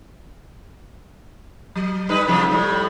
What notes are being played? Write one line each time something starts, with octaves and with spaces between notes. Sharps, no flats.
F#3
G3 D#4 B4
A2 C3 F3
A2 G3